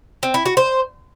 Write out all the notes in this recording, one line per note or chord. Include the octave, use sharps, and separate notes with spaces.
C4
E4
F#4
C5